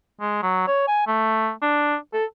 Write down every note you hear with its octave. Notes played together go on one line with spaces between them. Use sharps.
G#3
F#3
C#5
G#5
A3
D4
A4